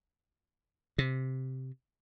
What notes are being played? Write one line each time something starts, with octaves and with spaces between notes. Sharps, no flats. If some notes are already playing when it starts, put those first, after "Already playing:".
C3